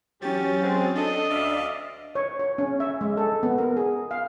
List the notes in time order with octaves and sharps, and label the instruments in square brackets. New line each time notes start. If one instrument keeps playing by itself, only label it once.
[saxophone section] E2 G4 [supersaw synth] F#3 A6 [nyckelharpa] C#4
[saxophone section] G#3 C4
[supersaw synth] D4 [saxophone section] A4 [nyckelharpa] D#5
[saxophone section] D2 [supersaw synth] D5 E5 F5
[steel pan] C#5
C#5
C#4
E5
G#3
A4
B3
A#4
G#4
F5